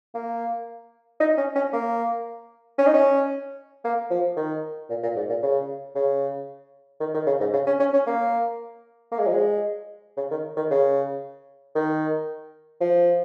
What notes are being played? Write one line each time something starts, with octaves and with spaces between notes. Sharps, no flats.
A#3
D#4
C#4
C#4
A#3
C#4
D#4
C#4
A#3
F3
D#3
A#2
A#2
G#2
A#2
C#3
C#3
D#3
D#3
C#3
G#2
C#3
C#4
C#4
C#4
A#3
A#3
G#3
F3
G#3
C#3
D#3
D#3
C#3
D#3
F3